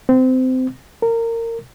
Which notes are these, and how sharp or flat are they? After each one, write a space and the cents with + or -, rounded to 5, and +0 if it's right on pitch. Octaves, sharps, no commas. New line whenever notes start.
C4 -25
A#4 -20